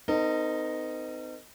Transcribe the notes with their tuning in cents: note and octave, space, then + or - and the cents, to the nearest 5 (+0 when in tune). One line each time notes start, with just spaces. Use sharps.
C4 -40 D#4 -5 A#4 -40